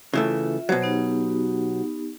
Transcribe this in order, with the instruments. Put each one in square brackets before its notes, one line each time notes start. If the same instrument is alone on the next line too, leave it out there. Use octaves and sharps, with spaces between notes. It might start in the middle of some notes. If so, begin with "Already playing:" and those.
[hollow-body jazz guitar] C#3 E3 A3 [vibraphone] F4 E5
[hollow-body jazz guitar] B2 F#3 [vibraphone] C5
[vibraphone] B3 D#4 G4